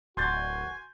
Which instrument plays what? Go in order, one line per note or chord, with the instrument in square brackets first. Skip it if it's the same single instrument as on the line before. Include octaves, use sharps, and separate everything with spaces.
[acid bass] D1 [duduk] F#4 [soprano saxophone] G#5 [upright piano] C6 G6 A6